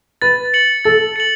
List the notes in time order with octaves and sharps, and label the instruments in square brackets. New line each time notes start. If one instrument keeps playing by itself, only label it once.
[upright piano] B4 [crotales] A6
[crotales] C#7 F#7
[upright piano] A4 [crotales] A6
[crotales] C#7 F#7